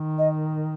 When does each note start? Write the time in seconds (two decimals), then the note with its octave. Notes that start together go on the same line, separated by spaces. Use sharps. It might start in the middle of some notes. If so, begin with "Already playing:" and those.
Already playing: D#3
0.19 D#5